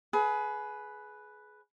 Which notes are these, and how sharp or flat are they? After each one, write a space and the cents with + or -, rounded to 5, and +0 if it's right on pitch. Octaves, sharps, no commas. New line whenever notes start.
G#4 +25 B4 +0